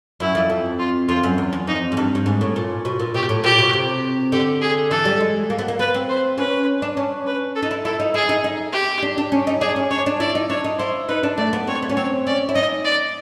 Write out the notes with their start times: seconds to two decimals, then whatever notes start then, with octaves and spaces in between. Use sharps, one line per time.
0.20 F#2 E4
0.35 F2
0.50 F2
0.79 F4
1.08 F2 F4
1.23 F#2
1.38 E2
1.53 E2
1.67 F2 D#4
1.92 G#2
1.97 G2
2.15 G2
2.26 G#2
2.41 A2
2.56 A#2
2.85 B2
2.99 A#2
3.14 B2 G4
3.29 A2
3.44 A#2 G4
3.58 B2
3.73 C3
4.32 D3 G4
4.62 G#4
4.90 E3 A4
5.05 G3
5.20 G#3
5.50 A#3
5.59 B3
5.68 A#3
5.79 B3 B4
5.94 C4
6.09 C5
6.38 C#4 B4
6.82 D4
6.97 C#4
7.27 B4
7.55 A4
7.63 D#4
7.71 E4
7.85 E4 A4
8.00 D#4
8.14 E4 G#4
8.29 D#4
8.44 D#4
8.73 G4
9.02 D4
9.18 D4
9.32 C#4
9.47 D#4
9.61 D4 G#4
9.76 C#4
9.91 D4 C#5
10.06 D4
10.20 E4 D5
10.35 D#4
10.49 D4 C#5
10.64 D#4
10.79 E4 C5
11.09 D#4 B4
11.23 D4
11.38 A3 D5
11.53 B3
11.67 C4 C#5
11.82 B3
11.89 C#4
11.97 C4 C#5
12.27 C#4 D5
12.49 E4
12.55 D#4 D#5
12.85 D5